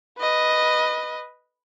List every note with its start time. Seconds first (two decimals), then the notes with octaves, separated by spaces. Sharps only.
0.18 B4 D#5